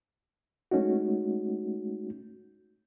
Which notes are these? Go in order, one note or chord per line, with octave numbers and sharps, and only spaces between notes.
G#3 A3 C#4 D#4 F#4